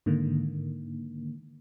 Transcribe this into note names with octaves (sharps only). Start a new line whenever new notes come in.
G#2 D3 D#3 A#3